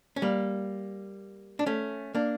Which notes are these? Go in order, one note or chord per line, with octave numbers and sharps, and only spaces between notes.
C#4
G3 A#3
D4
A3 C#4
A#3 D4